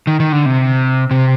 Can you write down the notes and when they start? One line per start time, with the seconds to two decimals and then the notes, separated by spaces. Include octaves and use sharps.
0.07 D#3
0.20 D#3
0.32 D3
0.46 C3
1.11 C3